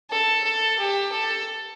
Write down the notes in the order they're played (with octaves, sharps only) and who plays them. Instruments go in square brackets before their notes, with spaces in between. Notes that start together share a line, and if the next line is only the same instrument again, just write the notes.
[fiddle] A4
A4
G4
A4